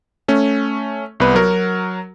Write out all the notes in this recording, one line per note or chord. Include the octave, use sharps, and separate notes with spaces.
A3 C#4
C2 B3 B4
F#3 F#4 A#4